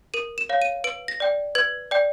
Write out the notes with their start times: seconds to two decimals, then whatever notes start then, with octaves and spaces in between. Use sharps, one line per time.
0.14 A#4 D#7
0.38 E7
0.49 C#5 F5
0.62 D#7
0.84 B4 D7
1.08 A#6
1.20 D5 G5
1.55 B4 G#6
1.91 D5 G5